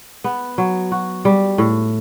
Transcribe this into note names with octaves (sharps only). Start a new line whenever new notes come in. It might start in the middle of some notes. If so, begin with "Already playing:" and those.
B3
F#3
F#4
G3
A2